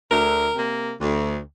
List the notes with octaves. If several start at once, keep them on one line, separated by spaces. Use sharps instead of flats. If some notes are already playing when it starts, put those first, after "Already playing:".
D2 A#4
C3 A#3
D2